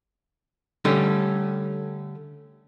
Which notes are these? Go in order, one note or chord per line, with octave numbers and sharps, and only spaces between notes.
D3 G3 A3 C#4